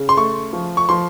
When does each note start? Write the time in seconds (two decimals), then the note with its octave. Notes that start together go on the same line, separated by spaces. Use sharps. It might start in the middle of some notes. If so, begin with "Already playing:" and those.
Already playing: C#3
0.09 C6
0.17 A3 C#6
0.53 F3
0.77 C#6
0.89 F3 C6